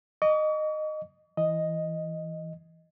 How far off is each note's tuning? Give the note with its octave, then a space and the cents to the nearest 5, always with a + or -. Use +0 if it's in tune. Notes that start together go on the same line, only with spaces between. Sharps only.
D#5 -15 C#6 +45
E3 +0 D#5 +0